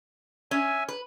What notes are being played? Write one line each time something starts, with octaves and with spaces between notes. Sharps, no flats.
C#4 E5 G#5
B4